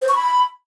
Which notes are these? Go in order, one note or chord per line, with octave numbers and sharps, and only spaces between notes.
C5
C#6
B5